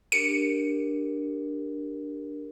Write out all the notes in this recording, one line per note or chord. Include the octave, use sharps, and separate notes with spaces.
D4 G4 A#4 C#7